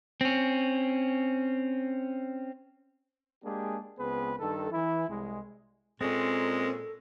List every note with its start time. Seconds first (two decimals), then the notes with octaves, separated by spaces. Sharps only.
0.21 C4 C#4
3.44 G#3 A#3 D4 G4 G#4
3.98 C#2 B3 C4 G#4 B4
4.39 G2 D#3 A4
4.71 E3 E4
5.09 C2 G#3
6.01 A#2 G#3 C4 C#4 A4